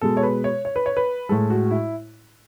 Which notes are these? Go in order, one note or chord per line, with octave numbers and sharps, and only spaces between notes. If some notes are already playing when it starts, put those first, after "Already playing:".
B2 G#3 A4
C#5
B4
C#5
C#5
B4
C#5
B4
A2 G#3 A4
F#4
E4